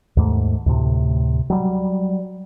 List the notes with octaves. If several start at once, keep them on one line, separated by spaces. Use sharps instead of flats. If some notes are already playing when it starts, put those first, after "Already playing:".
D#2 G#2 A3
D2 A2 C3
F#3 G3